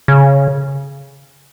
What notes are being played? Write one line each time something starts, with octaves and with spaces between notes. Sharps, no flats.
C#3